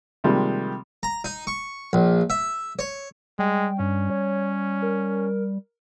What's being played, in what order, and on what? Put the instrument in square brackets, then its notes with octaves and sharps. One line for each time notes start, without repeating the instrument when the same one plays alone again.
[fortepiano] C3 D#3 F3 G3 G#3 A#3
[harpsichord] A#5
D#4
C#6
A#1
E5
C#5
[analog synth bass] G3 [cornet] G#3 [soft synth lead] G5
[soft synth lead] G2 [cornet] C#4
[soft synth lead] C#5
A#4